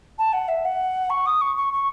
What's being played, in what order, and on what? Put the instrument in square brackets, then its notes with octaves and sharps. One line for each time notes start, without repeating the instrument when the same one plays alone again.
[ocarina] A5
F#5
E5
F#5
C#6
D#6
C#6
C#6
C#6